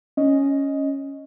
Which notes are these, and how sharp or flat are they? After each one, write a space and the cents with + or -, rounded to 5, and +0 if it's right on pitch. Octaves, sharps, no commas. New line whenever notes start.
C#4 +0 D#5 +0